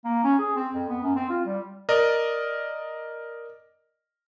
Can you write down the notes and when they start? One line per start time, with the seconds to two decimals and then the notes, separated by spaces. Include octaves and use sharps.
0.05 A#3
0.24 C#4
0.39 G#4
0.56 C4
0.74 F2
0.89 B3
1.03 F#2
1.16 C4
1.30 F4
1.46 G3
1.89 A#4 D5 D#5